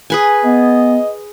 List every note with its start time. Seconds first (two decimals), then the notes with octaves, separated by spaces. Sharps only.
0.10 G#4 B4 G#5
0.45 B3 D#5